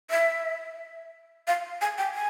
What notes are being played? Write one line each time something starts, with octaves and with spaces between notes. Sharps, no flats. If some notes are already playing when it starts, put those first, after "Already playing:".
E5
F5
G#5
G5
G#5